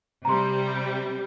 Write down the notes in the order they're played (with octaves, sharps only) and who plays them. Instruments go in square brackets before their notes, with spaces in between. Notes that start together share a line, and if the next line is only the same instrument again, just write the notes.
[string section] C3 G3 [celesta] A#5 C6